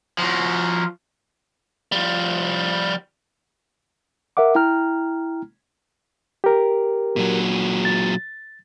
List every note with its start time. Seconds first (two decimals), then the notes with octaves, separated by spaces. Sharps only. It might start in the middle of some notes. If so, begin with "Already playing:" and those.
0.18 F3 F#4
1.92 F3 G3
4.37 A#4 E5 F#5 D6
4.55 E4 G5 A#5 F6
6.44 G4 A#4
7.16 A#2 F#3
7.85 A6